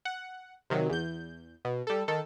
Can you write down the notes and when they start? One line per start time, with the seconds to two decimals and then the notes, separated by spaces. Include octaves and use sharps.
0.05 F#5
0.70 C3 D#3 F#3
0.89 E2 G6
1.65 B2
1.87 G3 A4
2.08 D#3 A4